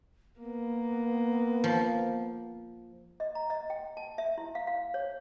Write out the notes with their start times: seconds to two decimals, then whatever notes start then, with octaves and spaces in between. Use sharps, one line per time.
0.40 A#3 B3
1.64 F3
3.20 D#5
3.35 A#5
3.50 D#5
3.70 G5
3.97 A5
4.18 E5
4.38 E4
4.55 F5
4.67 F5
4.94 C#5